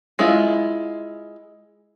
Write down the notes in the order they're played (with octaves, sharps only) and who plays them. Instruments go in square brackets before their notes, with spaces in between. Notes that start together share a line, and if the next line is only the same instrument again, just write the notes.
[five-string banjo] G#3 E4 F4